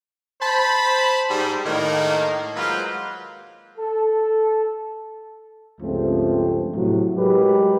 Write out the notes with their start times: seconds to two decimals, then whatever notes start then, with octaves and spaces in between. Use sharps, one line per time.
0.41 C5 A5 B5
1.30 G#2 G3
1.65 A2 D#3 A#3
2.56 F#3 G#3 A#3 F4 B4 C5
3.78 A4
5.81 C#2 G2 F3 A3 C4
6.75 A2 C3 F#3
7.16 F#3 G#3 G4 A#4 B4